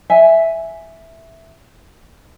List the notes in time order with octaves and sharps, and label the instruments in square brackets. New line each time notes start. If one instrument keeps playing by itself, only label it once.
[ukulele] E5 G#5